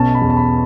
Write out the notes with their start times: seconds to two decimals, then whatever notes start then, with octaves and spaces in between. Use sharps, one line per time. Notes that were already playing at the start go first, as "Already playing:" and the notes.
Already playing: B1 B2 C#4 A5
0.15 B5
0.21 E2
0.30 A5
0.37 B5